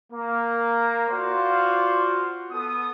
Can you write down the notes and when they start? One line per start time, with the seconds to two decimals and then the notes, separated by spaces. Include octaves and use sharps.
0.13 A#3
1.09 F4 F#4 C5 D5 F5
2.52 B3 A4 D#6